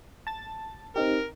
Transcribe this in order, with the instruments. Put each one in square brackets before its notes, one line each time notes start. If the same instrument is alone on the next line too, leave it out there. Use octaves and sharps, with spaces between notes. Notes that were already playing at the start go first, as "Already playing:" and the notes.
[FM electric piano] A5 A6
[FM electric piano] C4 D#4 G4 [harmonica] A#4